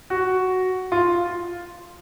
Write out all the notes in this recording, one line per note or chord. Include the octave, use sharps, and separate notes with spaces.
F#4
F4